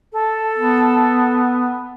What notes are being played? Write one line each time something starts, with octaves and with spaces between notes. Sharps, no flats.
A4
B3